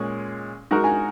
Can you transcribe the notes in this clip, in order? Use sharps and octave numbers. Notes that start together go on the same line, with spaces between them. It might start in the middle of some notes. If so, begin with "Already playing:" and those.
Already playing: A#2 G#3 C#4 G#4
G#3 D#4 F#4 A#4 F#5
G#5